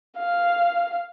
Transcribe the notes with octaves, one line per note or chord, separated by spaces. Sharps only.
F5